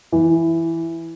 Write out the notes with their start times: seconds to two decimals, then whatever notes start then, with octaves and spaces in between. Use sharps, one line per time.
0.12 E3